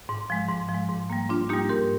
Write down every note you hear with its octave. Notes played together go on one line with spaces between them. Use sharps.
G#2
F3 G#3
G#2
F3
G#3
G#2
G3 A#3
G#2 D4 F4
G3 A#3 D#4 G4
G#2 G4 A#4